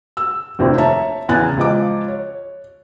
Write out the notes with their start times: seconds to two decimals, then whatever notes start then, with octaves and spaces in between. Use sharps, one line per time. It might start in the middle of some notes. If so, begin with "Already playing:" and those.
0.17 E6
0.59 F1 D#2 C3 F3
0.78 C#5 E5 A5 A#5
1.29 E2 C#3 E3 G#5 F#6 A6
1.57 C#2 F3 D#5 D6
2.08 C#5